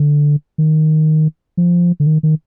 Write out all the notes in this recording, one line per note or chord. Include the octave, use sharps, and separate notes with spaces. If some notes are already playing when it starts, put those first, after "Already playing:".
Already playing: D3
D#3
F3
D3
D#3
D#3